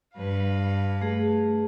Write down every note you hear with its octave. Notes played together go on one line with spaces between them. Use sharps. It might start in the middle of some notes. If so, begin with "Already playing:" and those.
G2 B4 F5
A3 G#4